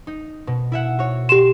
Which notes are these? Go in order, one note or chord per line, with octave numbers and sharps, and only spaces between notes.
D#4
B2
E4 E5 F#5
F#4 C#5
G4 C6 E7